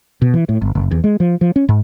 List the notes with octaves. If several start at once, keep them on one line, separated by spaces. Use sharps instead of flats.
B2
E3
A2
G1
F#1
E2
G#3
F3
F3
C#4
G#2